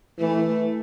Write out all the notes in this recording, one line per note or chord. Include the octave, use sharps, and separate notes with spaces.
E3 A3